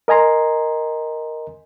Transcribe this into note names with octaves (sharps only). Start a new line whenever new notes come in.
A#4 D#5 G#5 A#5 C6